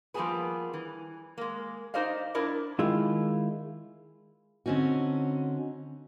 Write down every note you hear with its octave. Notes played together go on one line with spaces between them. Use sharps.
F3 G3 A#3 B3 G#4 B4
E3
G#3 A#3
D#4 G4 C5 D5 D#5 F5
D4 E4 A#4 D5 D#5
D#3 G#3 E4 F4
D3 C4 C#4 D#4 F#4